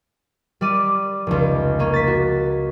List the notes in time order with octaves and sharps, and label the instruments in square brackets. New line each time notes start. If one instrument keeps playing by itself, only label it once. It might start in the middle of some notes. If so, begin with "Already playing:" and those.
[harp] G3 D5 D#7
F1 C#2
A#3 C#4
A6 B6
F#4